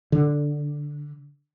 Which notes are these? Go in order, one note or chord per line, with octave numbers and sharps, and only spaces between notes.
D3